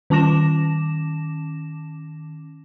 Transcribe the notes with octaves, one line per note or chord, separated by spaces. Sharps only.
D#3 C#4 A5 D6 A#6 E7